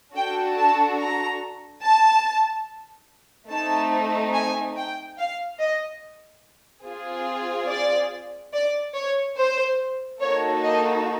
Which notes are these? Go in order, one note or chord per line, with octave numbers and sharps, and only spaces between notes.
D4 F#4 A4 G5
A5
A#5
A5
A3 C4 D#4 A5
G#5
G5
F5
D#5
C4 F4 G#4
D5
D5
C#5
C5
A#3 D#4 F#4 A4 C#5
D#5